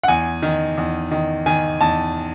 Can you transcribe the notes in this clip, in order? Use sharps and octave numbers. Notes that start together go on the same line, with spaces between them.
F#5
E2 G#5
D#3
E2
D#3
D#3 G#5
E2 A5